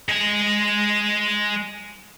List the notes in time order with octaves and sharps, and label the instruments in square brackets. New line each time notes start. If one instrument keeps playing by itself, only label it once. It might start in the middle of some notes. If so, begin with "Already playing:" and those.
[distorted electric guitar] G#3 G#5